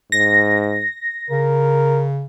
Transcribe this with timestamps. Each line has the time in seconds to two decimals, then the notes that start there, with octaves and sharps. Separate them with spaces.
0.12 G#2 A#6
1.30 C#3 A#4